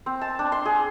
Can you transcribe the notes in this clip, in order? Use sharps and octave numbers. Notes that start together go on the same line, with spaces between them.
C4
A5
D4
C6
G#4